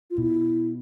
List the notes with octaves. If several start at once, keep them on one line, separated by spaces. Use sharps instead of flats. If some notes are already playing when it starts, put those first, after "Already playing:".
F4
B2 E4